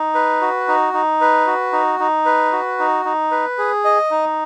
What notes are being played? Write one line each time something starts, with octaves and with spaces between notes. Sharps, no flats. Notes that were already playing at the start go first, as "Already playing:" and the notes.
Already playing: D#4
B4
F#4
D#4
D#4
B4
F#4
D#4
D#4
B4
F#4
D#4
D#4
B4
G#4
D#5
D#4